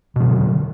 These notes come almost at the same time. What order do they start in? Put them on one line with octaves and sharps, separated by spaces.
B2 E3 F#3 D3